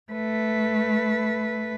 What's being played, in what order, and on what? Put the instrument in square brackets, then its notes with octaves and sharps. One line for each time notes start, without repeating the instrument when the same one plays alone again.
[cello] A3 B4